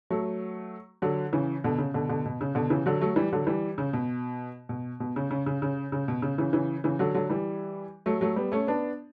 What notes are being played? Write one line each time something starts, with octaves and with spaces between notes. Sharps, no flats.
F#3 A3
D3 F#3
C#3 E3
B2 D3
C#3
B2 D3
B2 D3
B2
C#3
B2 D3
C#3 E3
D3 F#3
F#3 A3
E3 G3
D3 F#3
E3 G3
C#3
B2
B2
B2
C#3
C#3
C#3
C#3
C#3
B2
C#3
C#3 E3
C#3 E3
C#3 E3
D3 F#3
D3 F#3
E3 G3
F#3 A3
F#3 A3
G3 B3
A3 C#4
B3 D4